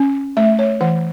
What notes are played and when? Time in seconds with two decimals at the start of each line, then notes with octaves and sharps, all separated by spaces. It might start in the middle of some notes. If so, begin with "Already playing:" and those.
Already playing: C#4
0.37 A3 E5
0.59 C#5
0.81 E3 F#5